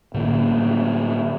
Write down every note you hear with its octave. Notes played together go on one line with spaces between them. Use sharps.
A2 D3 A#3